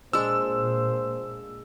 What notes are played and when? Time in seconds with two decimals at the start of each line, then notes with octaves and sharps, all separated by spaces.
0.13 A#2 G#3 D4 C5 E6